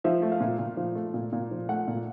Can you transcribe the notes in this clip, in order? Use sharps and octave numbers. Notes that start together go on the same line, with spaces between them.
F3 E5
A3
F5
A#2
A#2
F3
A3
A#2
A#2
F3
A3 F#5
A#2